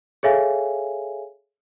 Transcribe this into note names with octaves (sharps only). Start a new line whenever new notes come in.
G#4 A4 C#5 E5 F5 G#5